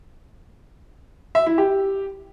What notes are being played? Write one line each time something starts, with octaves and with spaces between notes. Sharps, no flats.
E5
E4
G4